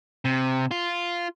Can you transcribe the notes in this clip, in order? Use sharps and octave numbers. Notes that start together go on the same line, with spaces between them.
C3
F4